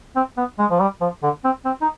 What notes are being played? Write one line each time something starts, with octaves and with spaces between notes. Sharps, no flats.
C4
B3
G#3
F3
G3
F3
D3
C4
C4
D#4